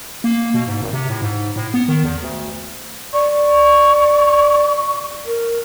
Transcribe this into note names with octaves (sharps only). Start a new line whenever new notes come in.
A#3
B2
G#2
G#1
C3
A2
G#2
A2
B3
D#3
E2
D2
D5 C#6
A#4